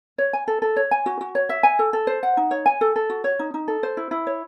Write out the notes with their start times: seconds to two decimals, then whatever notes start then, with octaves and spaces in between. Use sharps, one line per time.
0.18 C#5
0.33 G#5
0.48 A4
0.62 A4
0.76 C#5
0.91 G#5
1.06 F#4
1.21 F#4
1.35 C#5
1.49 E5
1.63 G#5
1.79 A4
1.93 A4
2.07 C5
2.23 F#5
2.37 D#4
2.51 C#5
2.66 G#5
2.81 A4
2.96 A4
3.10 F#4
3.24 C#5
3.39 D#4
3.54 D#4
3.68 A4
3.83 C5
3.97 E4
4.11 E4
4.27 C#5